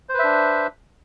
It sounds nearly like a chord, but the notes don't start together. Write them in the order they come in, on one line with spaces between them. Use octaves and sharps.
C5 B4 E5 D4